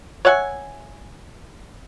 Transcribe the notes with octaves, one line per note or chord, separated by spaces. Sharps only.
C#5 E5 F#5 G#5